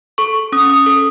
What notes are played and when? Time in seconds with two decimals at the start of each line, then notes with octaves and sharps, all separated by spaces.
0.18 A4 C#6
0.52 C#4 D#6
0.70 D#6
0.86 A4 D#6